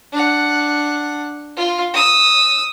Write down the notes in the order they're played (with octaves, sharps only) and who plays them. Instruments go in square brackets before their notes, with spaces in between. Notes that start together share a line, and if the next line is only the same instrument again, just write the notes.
[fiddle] D4 F#5
F4
D#6 E6